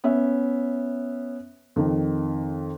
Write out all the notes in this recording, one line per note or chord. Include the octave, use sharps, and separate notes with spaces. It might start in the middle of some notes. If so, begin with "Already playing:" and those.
B3 C#4 E5
F2 D#3